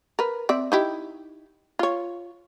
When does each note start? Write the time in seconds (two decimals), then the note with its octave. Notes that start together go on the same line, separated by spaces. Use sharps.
0.19 A#4 B4
0.49 C4 D5 E5
0.72 D#4 E4 G4
1.79 F4 C#5